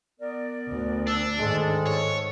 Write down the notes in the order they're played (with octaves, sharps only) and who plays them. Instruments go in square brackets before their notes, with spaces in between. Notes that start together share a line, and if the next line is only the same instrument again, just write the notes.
[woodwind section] B3 A#4 D5
[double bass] D2
[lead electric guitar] D4 [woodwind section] E6
[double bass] G#2 [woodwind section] D#3 A4 [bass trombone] G#3
[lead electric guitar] C#5